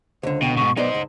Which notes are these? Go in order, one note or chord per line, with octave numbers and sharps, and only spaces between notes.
C#2 D3 C5
B2 G5
G#2 B2 C#6
B1 B3 D#4 C5 D5 D#5
C#2